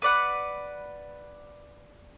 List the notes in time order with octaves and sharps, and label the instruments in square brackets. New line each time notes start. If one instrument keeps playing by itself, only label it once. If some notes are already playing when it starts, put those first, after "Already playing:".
[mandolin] B4 D5 F#5